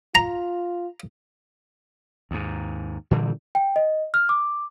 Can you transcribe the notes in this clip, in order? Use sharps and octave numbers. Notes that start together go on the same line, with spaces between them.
F4 A#5
D#2 G#2
A#2 D3 E3 G3
G5
D#5
F6
D6